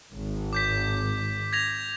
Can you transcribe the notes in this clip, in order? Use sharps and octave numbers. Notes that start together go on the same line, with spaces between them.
G#1
D6 G6 B6
G#6 A#6 F7